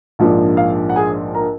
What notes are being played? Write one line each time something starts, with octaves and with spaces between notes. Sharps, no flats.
A#1 G#2 F3 A#3 D4
F5
F#5
G#4 G#5
A#4 A#5